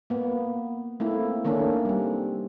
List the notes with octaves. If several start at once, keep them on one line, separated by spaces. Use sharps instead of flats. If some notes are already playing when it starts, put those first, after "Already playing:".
A#3 B3
A3 A#3 C4 E4
D#3 A3 A#3 C#4 D4
G3 C4